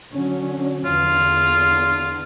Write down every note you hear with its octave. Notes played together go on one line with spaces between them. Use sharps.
D3 F#3 C#4
E2 D3 F4